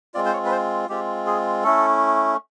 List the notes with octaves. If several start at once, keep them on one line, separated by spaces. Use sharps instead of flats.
G#3 C4 F4 D5
C5
C#5
B4
C5
G#3 C4 F4 G4
G#4
A3 C#4 E4 A4